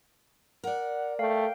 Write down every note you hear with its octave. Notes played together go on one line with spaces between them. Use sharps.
A#4 D5 F#5
A3 F5 G5